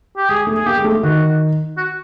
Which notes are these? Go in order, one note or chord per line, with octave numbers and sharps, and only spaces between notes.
G4
G#3 G#4
A3
G#4
A#3 G4
G#3
A3
D#3 F#4
F#4